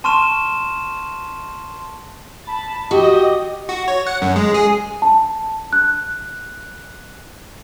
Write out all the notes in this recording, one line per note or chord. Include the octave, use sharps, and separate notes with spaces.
A5 C6 C#6 F6 D#7 E7
A5 B5
F#4 G4 D#5
F#4
C#5
F#5
F#2
G#3
G#4
A5
F#6